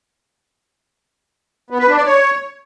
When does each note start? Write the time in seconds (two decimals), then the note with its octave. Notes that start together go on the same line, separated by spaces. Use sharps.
1.70 B3
1.79 B4
1.88 D4
1.97 D5
2.06 C#5